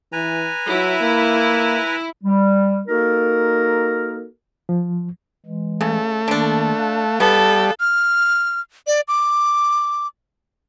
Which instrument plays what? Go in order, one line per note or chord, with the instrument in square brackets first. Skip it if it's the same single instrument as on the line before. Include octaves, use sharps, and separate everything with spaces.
[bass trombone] E3 [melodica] B4 G#5 A#5
[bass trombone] F#3 [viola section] E4
[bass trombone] A#3
[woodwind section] G3
A#3 D#4 F#4 A4 A#4
[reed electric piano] F3
[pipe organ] E3 G#3
[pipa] C#3 [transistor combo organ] A3
[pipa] D3 D4 [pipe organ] D#3 A#3
[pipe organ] F5 A5 F#6
[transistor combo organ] G3 [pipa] B3 [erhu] A4
[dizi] F6
D5
D6